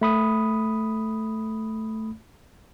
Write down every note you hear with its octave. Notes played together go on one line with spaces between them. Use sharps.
A3 B5 D#6